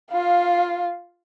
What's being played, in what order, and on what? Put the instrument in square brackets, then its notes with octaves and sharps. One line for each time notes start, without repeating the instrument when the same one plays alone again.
[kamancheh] F4 F5